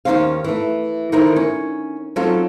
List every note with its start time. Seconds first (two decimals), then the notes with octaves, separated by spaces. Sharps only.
0.05 D#2 G#2 D#3 C#4 C5 F5
0.44 E3 A3
1.12 D3 D#3 D#4 E4 A#4 C5
1.36 C#4
2.16 F#3 C4 C#4 D#4 F4 A4